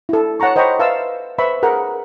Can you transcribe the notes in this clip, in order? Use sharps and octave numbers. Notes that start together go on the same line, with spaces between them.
E4 A4
C#5 F#5 A5 A#5 C#6
C5 D#5 G5 A#5 B5 C#6
B4 E5 F5 A5 C6 E6
B4 C5 E5 B5 C#6
G#4 A#4 F#5